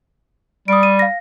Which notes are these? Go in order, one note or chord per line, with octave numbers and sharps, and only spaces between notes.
G3 D#6 D7
D#7
F5 A#6